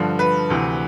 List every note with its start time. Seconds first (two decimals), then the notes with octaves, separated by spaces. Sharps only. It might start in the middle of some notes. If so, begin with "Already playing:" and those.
Already playing: G2 D3 F3
0.19 B4
0.50 D2 C3 E3